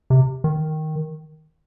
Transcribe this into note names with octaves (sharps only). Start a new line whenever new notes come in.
C3
D#3